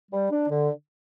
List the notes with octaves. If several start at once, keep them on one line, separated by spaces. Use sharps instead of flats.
G3
D4
D3